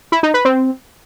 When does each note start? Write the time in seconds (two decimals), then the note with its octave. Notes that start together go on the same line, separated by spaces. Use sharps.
0.12 E4
0.23 D#4
0.34 B4
0.45 C4